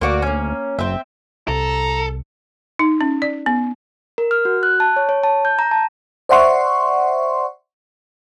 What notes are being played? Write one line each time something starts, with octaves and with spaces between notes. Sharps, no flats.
D2 A#3 F#4 D5
A#3 C#4
F#1 C4 E5
C2 A4 A#5
D#4
C#4
D5
B3
A#4
F6
F#4
F#6
A5
C#5
C#5
A5
G6
A#5
A5
C5 D5 E5 F#5 C6 C#6